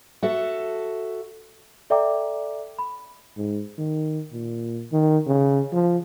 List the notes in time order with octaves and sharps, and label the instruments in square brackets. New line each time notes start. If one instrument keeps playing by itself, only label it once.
[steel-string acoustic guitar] F#4 A4 E5
[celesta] A4 D5 E5 G5 A#5 D6
B5
[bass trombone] G#2
D#3
A#2
D#3
C#3
F3